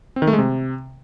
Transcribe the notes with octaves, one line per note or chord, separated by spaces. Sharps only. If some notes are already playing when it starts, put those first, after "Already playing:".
C4
D#3
A3
G#3
C3